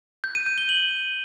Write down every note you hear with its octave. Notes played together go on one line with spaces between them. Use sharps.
G6
D#7
G6
G7
F#7